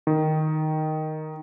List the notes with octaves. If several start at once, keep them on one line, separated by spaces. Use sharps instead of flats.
D#3